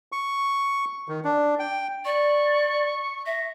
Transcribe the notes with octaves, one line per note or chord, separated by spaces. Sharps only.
C#6
D#3
D4
G5
D5 C#6
E5 A#6